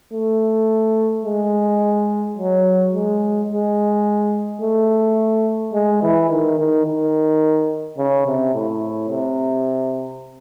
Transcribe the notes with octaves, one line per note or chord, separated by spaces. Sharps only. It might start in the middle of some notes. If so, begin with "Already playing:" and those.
A3
G#3
F#3
G#3
G#3
A3
G#3
E3
D#3
D#3
D#3
C#3
C3
A2
C3